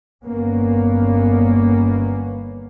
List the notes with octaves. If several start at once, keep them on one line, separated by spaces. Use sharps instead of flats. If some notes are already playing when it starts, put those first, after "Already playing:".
G1 A#3 B3 C#4